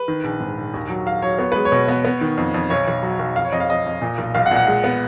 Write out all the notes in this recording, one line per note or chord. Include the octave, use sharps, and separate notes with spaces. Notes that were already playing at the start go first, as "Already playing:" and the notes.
Already playing: B4
D#3
A#1
G#2
A#1
D#2
F#3
F#3 F5
F#3 C#5
B3 C#5
G#3 B4
C#5
B2
B3
B3
D#3
F2
F2
B1 C#5
B1
F#3
B1
F2 F5
C#5
F2 D#5
F5
F2 D#5
F2
A#2
B1
B1 F5
F#5
A#2
F#5
G#3
B3